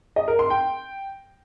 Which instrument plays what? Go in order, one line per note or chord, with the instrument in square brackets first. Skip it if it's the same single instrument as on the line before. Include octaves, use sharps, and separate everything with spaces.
[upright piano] D#5
A#4
C6
G5